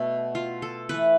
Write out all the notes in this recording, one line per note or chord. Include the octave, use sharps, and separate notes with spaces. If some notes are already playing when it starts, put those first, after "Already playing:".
Already playing: B2 A3
F4
A4
E3 A3 B4